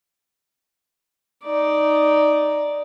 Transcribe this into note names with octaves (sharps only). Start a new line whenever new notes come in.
D#4 D5